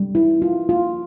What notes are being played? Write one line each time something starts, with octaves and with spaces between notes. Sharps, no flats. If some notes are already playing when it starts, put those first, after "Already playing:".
Already playing: G3
E4
F4
F4